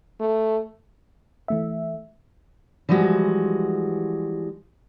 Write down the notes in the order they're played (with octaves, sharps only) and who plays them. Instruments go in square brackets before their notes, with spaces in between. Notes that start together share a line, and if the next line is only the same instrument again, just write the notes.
[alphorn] A3
[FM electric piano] E3 A3 E5
[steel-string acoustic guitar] E3 F3 G3 G#3 F#4